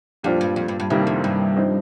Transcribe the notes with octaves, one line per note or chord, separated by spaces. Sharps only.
F2 A#2 G3 D4 F4 C5
G2
F2
G2
G2
C2 G2 C3 D#3 G3 A#3
F2
G2
F3 C4 D#4